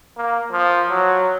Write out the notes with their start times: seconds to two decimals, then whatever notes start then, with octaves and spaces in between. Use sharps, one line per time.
0.17 A#3
0.51 F3
0.90 F#3